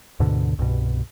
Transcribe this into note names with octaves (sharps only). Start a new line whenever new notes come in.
D2 G#2 B2 D3
C2 G2 B2